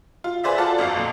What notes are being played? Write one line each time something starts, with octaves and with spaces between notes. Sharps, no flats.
F4
G#4 B4 C5 D5 E5
F4 F#4 A4 D5 A5
G1 F2 F5 C7
A#2